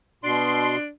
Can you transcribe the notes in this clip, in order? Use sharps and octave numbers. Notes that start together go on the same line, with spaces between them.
B2 D4 C6